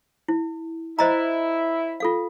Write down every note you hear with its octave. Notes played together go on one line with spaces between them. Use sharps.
E4
E4 C5 D#5 A#5
F4 A4 F5